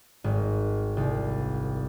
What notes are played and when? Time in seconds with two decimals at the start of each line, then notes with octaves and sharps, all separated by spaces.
0.24 G#1
0.97 C2